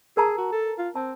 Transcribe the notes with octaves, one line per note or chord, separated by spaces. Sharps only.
G#4 A#4 A5 A#5
F#4
A4
F4
C4 A5